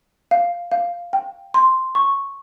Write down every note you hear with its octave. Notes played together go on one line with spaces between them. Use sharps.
F5
F5
G5
C6
C#6